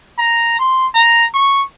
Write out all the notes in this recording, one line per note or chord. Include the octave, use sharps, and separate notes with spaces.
A#5
C6
A#5
C#6